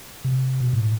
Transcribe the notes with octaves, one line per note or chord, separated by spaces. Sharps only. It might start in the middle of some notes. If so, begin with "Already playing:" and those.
C3
B2
A2